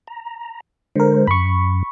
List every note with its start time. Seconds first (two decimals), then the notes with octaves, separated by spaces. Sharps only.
0.07 A#5
0.96 D3 G#3 A#4 C5
1.27 F#2 B5 C#6